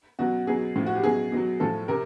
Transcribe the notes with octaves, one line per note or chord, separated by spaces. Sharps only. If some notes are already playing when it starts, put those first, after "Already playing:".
B2 F#3 F#4
B2 F#3 G#4
A2 F3
F#4
G4
B2 F#3 G#4
B2 F#3
A2 F3 A4
C3 A#4